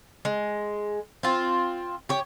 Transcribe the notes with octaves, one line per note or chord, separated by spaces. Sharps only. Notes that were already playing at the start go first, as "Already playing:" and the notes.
G#3
C4 F4
G4 C#5